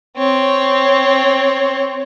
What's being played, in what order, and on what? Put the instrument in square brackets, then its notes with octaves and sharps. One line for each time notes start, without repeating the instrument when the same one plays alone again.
[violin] C4 C#5